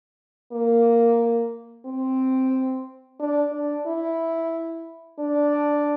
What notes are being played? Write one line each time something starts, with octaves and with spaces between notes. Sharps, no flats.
A#3
C4
D4
D4
E4
D4